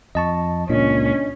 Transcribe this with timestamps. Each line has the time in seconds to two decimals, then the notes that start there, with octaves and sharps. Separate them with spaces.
0.15 F2 D#5 A5 C#6
0.69 C#2 A#2 C#4 D4 D#5